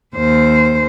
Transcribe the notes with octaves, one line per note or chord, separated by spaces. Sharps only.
D#2 C5